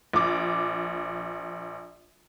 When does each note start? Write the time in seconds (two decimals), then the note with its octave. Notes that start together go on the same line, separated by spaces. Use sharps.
0.13 A#1 D6